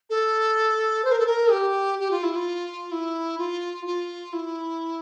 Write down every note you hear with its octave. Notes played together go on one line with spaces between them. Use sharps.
A4
C5
A#4
A4
A#4
G4
G4
F4
E4
F4
E4
F4
F4
E4